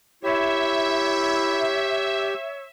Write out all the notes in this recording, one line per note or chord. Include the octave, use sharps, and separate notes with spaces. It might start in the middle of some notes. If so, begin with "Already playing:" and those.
E4 G4 C#5 E5